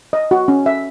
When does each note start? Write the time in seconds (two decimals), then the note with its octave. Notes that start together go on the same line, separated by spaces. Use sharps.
0.13 D#5
0.31 F#4
0.48 C#4
0.66 E5